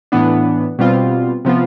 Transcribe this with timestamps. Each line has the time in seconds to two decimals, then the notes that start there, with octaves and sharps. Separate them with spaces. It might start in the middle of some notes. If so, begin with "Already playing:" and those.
0.12 A2 E3 B3 D4
0.79 B2 G3 C4 F4
1.45 C3 F3 B3 F4